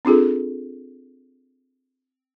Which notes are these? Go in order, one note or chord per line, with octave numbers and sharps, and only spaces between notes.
C4 D4 F4 G#4 A4